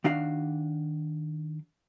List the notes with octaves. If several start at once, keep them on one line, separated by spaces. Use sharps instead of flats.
D#3 D4 F#4 F5